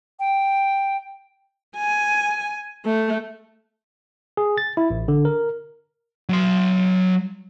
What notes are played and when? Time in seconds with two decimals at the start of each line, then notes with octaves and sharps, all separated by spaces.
0.20 G5
1.77 G#5
2.85 A3
4.37 G#4
4.58 A6
4.77 E4
4.90 A1
5.08 D3
5.25 A#4
6.29 F#3 C6